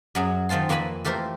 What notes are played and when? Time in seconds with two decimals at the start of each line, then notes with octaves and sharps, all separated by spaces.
0.15 F#2 F#3 G#4
0.49 D#3 C4 F4 A5 C6
0.69 F2 A#3 C4 B4 G#5 B5
1.05 E3 A3 G4 A#4 C5